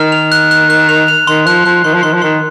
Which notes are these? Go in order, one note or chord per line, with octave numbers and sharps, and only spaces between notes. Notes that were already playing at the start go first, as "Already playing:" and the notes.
Already playing: D#3 F6
F7
F#6
F#6
F#6
F7
F7
D#3 C6
F3 F#6
F3 F#6
D#3 C6
F3
D#3 C6
F3
D#3 C6